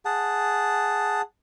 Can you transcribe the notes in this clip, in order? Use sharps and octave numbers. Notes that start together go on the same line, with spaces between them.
G#4 F#5 A5